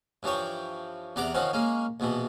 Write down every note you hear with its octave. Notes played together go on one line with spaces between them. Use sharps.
G2 E3 F3 C#5 G5
E2 C3 D5 F#5 A#5 D6
D#3 F3 C4 C#4 F#5
G#3 A#3 C#4
A#1 B2 E3